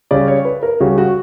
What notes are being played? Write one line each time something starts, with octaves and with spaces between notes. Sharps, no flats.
C#3 G3 C#4 D5
C#5
B4
A#4
C#3 G3 C#4 F#4
F#4